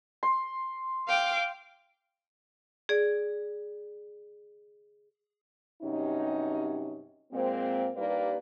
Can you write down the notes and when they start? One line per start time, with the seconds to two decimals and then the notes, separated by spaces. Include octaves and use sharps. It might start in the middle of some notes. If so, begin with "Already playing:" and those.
0.23 C6
1.07 F5 G5 D6
2.89 G#4 D5
5.82 G2 C3 F#3 C#4 D#4
7.32 A#2 G#3 A#3 C4
7.96 G2 G3 A#3 D#4 B4 D5